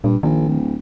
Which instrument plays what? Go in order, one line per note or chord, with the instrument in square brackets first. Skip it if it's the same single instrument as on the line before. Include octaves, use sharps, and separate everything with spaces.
[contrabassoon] G2 [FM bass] A#2
[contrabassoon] A#1 [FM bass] D#3
[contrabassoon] D1